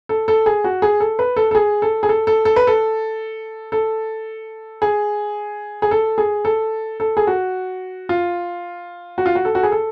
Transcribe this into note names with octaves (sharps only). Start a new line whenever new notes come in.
A4
A4
G#4
F#4
G#4
A4
B4
A4
A4
G#4
A4
G#4
A4
A4
A4
B4
A4
A4
G#4
G#4
A4
G#4
A4
A4
G#4
F#4
F4
F#4
F4
F#4
A4
F#4
G#4
A4